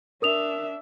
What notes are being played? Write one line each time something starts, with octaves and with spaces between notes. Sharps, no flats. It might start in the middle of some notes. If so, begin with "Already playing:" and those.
D4 A#4 E5 D#6 F7